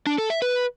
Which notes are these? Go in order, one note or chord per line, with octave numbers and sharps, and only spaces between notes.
D4
A4
E5
B4